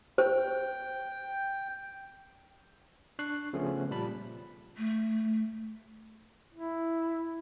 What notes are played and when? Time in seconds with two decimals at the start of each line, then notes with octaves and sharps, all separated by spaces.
0.18 C5 G5
3.19 D4 C#6 F#6 C7
3.53 C#3 F3 A3 B3 C#4
3.91 A#2 G3 A5 B5
4.78 A3
6.55 E4